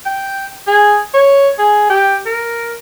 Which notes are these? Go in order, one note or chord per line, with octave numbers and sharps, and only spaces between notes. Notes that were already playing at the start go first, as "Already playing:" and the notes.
G5
G#4
C#5
G#4
G4
A#4